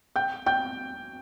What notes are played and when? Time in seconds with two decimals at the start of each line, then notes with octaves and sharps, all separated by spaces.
0.16 G5 G6
0.46 G5 G6